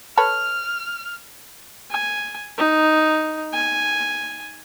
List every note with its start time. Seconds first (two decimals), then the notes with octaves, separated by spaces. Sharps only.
0.17 A4 B4 C#5 F6
1.91 G#5
2.58 D#4
3.54 G#5